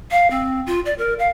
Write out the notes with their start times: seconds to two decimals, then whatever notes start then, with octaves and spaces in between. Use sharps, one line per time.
0.11 F5
0.31 C4
0.67 F4
0.86 D5
0.98 A#4
1.19 F5